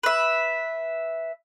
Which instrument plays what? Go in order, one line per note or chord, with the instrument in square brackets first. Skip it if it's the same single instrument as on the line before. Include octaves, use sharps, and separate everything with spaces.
[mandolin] B4 E5